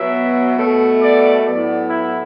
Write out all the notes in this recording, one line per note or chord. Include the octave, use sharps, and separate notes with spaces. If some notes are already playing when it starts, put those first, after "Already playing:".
Already playing: B2 F#3 B3 E5
B2 A3
D5
A2 F#3 B3 D5
E4